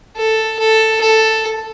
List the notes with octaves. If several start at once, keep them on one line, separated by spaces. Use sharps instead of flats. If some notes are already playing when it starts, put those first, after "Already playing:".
A4
A4
A4